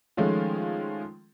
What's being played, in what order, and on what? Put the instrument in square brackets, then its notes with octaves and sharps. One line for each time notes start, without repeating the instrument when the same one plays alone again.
[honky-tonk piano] D#3 F3 G#3 A3 C#4 F4